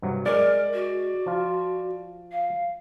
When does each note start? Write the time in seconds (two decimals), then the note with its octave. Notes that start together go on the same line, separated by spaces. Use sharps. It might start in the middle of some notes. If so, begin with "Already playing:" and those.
0.02 G2 C3 F#3
0.26 G#3 A#4 D5
0.73 F#4
1.26 F3 F4
2.31 F5